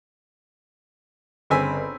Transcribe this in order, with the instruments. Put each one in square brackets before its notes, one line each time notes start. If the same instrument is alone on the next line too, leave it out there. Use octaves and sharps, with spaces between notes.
[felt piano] G1 E6 B6 [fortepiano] C#3 C4 G#5